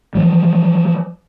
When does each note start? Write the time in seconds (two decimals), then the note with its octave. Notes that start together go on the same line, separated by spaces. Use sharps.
0.15 E3 F3 G3